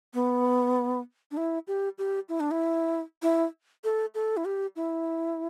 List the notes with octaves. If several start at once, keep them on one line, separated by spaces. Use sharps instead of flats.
B3
D4
E4
G4
G4
E4
D4
E4
E4
A4
A4
E4
G4
E4